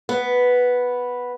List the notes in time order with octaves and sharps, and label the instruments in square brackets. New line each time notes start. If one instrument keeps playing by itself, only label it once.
[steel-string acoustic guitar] B3